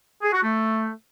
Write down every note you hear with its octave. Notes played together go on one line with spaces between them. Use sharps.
G#4
F#4
A3